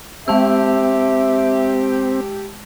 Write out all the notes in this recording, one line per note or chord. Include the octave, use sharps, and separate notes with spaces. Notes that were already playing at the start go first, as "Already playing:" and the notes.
G#3 C4 G4 E5 A5 E6